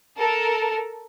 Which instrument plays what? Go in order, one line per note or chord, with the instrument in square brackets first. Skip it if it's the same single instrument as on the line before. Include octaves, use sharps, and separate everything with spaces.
[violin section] A4 A#4